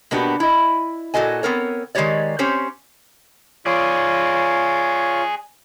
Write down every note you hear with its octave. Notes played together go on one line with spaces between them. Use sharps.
B2 A#3 B3 D4 F#4 G4
E4 D#5
A#2 F#4 A4 D#5 G#5
B3 C4 A#4 C#5
D#3 G#3 D#4 G4 C#5 D5
C4 C#4 G4 C5 C#5
F4 G#4 C#5 D5